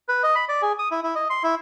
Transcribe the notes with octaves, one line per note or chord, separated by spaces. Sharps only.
B4
D#5
B5
D5
G#4
D#6
E4
E4
D#5
C6
E4